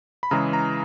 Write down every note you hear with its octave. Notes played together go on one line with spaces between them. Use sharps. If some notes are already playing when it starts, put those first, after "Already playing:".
B5
C#3 E3 G#3 A#5
A#5